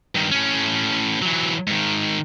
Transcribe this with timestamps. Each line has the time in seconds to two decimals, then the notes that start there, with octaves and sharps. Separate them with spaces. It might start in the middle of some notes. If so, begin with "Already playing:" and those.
0.15 G2 D#3
0.31 A2 C#4
1.22 E3 F#3
1.67 G#2 D#3